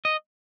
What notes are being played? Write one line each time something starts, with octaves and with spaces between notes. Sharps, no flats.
D#5